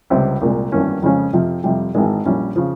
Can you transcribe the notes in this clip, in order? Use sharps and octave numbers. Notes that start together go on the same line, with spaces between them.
C#2 C3 G3 C4
C2 A#2 G#3
G#1 G2 E3 A#3 C#4
F2 C#3 F3 G#3 C#4
F2 C3 F3
F2 C3 G3
G#1 G#2 E3 G#3
A#1 A#2 G3 C#4 E4
C#3 F3